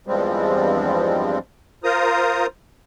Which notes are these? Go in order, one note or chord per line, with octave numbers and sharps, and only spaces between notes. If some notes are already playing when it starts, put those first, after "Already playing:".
E2 G2 F3 G3 G#3 C4
F4 A#4 C5 A#5 D#6